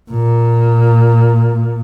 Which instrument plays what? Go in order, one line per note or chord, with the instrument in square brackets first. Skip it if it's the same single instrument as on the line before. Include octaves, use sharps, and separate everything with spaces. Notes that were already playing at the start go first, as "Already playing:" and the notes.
[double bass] A#2